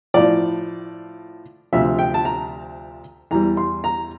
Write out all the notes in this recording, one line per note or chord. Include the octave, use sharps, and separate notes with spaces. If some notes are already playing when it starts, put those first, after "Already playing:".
A2 F3 D5
D2 C3 F3 E5
G5
A5
A#5
E2 E3 G3 A#5
C6
A#5